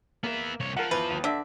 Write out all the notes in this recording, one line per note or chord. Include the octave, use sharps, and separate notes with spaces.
A#3 B3 E5
C2 C#5
F3 A#4 F#5
E2 B4
D#2
D3 D4 E5